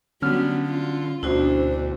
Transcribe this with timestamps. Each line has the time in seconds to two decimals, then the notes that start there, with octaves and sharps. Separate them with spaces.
0.22 D3 F#3 G3 B3 C#4 F6
0.67 F4
1.23 D2 B2 D4 E4 F#4 C5